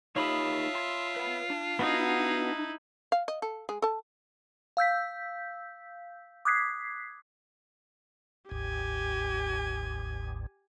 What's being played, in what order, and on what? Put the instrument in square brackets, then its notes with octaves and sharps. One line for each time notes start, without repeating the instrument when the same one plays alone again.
[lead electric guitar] D#4 G4 [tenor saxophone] F4 [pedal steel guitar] C#5 B5 D#6 [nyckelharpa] E5 A5
[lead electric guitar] C6
B4 F#5
D4
[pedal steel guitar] B3 F#4 D#5 [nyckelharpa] D#4 E4
[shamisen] F5
D#5
A4
G#3 G#4
A4 A5
[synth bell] F5 E6 G6 B6
D6 D#6 F#6 G#6 B6 C7
[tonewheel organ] G1 D2 G#2 [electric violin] G4 G#5